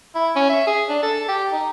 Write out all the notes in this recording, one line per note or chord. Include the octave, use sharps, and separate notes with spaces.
E4
C#4
E5
G#4
D4
A4
G4
D#4